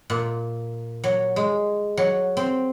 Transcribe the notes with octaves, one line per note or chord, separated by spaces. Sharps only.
A#2
F#3
G#3
F#3
C4